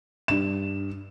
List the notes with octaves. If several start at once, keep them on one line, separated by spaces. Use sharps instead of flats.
G2 E7